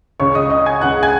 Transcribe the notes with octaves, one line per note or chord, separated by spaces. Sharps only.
C#2 C#3 C#5 C#6
D#5 D#6
D#5 D#6
G#5 G#6
C#2 C#3 F#5 F#6
G#5 G#6